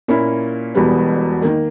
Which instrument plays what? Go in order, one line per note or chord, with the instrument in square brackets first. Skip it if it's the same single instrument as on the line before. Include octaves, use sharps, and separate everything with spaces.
[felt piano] A#2 A#3 C#4 E4
E1 E2 B2 G3 B3
D#3 A#3